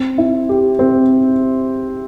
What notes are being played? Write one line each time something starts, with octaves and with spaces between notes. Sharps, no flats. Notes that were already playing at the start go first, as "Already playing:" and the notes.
Already playing: C4
E4
G4
C4